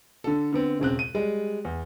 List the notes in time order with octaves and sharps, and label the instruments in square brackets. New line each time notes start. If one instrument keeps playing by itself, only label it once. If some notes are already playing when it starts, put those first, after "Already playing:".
[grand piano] D3 A4
D3 B3 C4
E1 C#3 C4 F#6
D#7
G3 G#3
E2